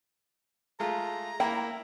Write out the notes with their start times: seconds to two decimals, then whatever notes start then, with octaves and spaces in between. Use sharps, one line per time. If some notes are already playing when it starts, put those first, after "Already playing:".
0.80 G#3 A3 F4 A#5
1.40 A#3 E4 G5